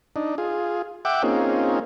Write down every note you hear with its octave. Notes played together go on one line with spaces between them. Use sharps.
D4 D#4
F4 G#4
E5 F#5 G5 D6
A#3 C4 C#4 D#4 F4 G#4